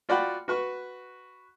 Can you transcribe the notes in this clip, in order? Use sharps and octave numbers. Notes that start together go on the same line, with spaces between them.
F4 F#4 D5 F#5 G5 B5
F#4 B4 C#6